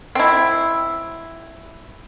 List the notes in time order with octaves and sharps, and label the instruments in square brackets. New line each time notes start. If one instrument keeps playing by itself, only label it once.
[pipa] C4 E4